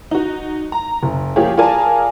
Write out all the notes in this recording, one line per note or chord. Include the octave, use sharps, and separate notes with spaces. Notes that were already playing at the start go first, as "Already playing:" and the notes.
D#4 F#4
A#5
F#1
F3 A#3 F4 G4 G#4 C#5
F4 G#4 A#4 D5 G#5 A5